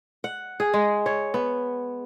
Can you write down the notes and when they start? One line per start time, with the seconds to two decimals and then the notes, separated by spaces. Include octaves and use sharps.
0.24 F#5
0.60 G#4
0.74 G#3
1.06 C#5
1.34 B3